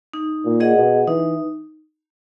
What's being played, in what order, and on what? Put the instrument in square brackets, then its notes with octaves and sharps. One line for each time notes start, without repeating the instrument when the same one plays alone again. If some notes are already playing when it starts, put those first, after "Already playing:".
[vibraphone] D#4
[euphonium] A#2
[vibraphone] G#4 D#5 F#5
[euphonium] B2
[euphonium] E3 [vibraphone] D#4